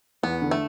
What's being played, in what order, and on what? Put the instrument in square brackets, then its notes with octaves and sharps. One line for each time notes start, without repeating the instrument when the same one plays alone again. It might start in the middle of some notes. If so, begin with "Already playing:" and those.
[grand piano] E2 [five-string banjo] B3
[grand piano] D3
[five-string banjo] A3